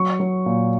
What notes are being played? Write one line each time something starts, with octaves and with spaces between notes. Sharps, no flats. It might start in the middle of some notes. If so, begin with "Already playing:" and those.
Already playing: F#3 C#6
F#3
A#2